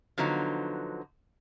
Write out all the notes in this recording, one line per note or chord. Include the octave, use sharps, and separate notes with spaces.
D3 F3 F#3 B3 D#4